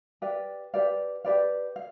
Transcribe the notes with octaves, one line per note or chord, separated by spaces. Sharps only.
G4 B4 D5 F5
G4 B4 D5 F5
G4 B4 D5 F5
F5